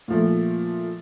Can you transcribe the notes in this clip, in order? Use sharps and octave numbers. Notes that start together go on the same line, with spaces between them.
A#2 F3 A3